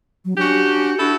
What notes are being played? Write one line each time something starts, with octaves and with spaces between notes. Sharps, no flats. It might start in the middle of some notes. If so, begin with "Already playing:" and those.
F#3
C#4 D4 F#4 G4
D4 E4 F#4 A4